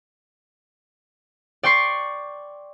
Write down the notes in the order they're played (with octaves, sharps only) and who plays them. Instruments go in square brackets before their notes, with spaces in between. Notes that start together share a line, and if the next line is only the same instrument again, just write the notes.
[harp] D5 G5 C6 C#6 C7